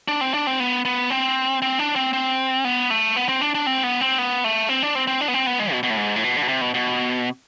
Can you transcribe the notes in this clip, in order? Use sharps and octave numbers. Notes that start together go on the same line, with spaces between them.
D4
C4
D4
C4
B3
B3
C4
C4
D4
C4
C4
B3
A3
B3
C4
D4
D4
C4
B3
C4
B3
A3
C4
D4
C4
C4
D4
B3
C4
B3
G#3
B2
B2
A2
G#2
A2
B2
D3
B2
C3
B2
B2